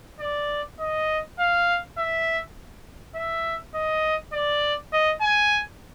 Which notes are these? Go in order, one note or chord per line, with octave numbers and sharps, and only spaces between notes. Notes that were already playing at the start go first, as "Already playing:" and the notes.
D5
D#5
F5
E5
E5
D#5
D5
D#5
G#5